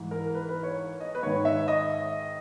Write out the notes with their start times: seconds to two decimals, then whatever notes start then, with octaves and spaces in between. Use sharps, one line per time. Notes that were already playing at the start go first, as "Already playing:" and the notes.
Already playing: G#2 E3
0.11 A#4
0.35 B4
0.49 B4
0.63 C#5
1.00 D#5
1.15 B4
1.23 G#2 D#3 C#5
1.45 E5
1.68 D#5